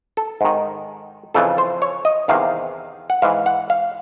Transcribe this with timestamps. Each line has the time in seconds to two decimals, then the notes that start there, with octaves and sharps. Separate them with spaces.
0.17 A4
0.41 G#2 D#3
1.34 F2 C#3 E3 A4
1.58 C5
1.82 C#5
2.05 D#5
2.28 E2 C3 D#3 F5
3.10 F#5
3.22 G#2 E3 F5
3.46 F#5
3.70 F5